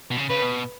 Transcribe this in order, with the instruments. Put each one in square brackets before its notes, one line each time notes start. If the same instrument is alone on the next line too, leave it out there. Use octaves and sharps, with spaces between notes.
[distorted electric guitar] B2
C#3
[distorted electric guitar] C#3 [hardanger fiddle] B4
[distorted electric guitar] B2